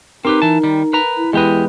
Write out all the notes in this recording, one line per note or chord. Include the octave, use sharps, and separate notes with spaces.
C4 D#4 G4 A#4 B4
E3 A5
D#3 G3
B4 A#5
E4
E2 G#3 G4 B4 D#5